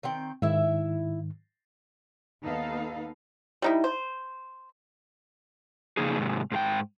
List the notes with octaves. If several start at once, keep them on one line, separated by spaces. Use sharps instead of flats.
D#3 C4 G5
G#2 D#3 E4 E5
D#2 B3 D#4 A4 B4 F5
G3 D#4 E4
C5
F2 C#3 A#3 D#4 G#4
G#2 C3
G#2 G#4 G5